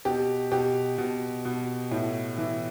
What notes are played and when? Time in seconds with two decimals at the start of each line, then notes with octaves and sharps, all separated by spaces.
0.05 B2 G4
0.52 B2 G4
0.98 B2
1.45 B2
1.91 A2
2.38 E3